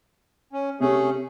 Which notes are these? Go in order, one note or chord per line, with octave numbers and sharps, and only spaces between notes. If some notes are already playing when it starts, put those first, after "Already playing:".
C#4
C3 A3 C#4 G#4